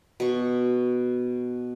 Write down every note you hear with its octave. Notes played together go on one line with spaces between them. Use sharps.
B2 C#6